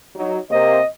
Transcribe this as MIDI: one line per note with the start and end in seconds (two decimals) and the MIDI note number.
0.16 0.38 54
0.16 0.38 63
0.51 0.79 48
0.51 0.79 58
0.51 0.79 72
0.51 0.87 75